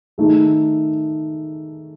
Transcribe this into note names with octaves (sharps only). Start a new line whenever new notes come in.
D#3 A3 D#4 G#4